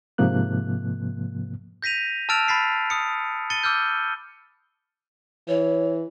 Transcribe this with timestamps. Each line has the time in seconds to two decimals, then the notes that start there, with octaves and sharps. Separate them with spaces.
0.18 G#2 C3 F3 A#3 F#6
1.82 G6 A#6 B6 D#7 F7
2.29 A5 E6 F6 A6 D7 F7
2.48 B5 A6 B6 C7
2.90 D#6 C#7
3.50 A6 C#7 D#7 G7
3.63 D6 E6 F6 G6
5.48 E3 C#5